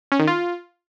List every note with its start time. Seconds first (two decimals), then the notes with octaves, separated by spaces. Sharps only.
0.12 C#4
0.20 D#3
0.27 F4